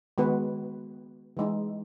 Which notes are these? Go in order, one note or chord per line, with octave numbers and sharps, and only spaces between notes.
D#3 G#3 B3 F#4 B4
E3 G#3 D#4